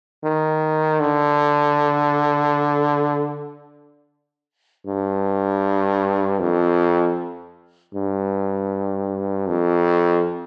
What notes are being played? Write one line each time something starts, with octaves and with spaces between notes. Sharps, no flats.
D#3
D3
G2
F2
G2
F2